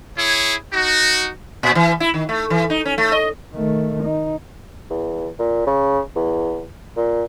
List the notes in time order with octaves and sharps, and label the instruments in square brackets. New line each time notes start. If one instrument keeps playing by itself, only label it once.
[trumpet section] E4 G#4 C#5
D#4 F#4
[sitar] A#2
E3
E4
D#3
A3
E3
D#4
C#4
A3
D#5
[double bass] D#3 A3
D#4
[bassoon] E2
A#2
C#3
E2
A#2